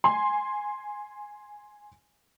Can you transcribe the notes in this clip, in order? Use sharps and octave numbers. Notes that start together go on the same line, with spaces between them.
G#5 C6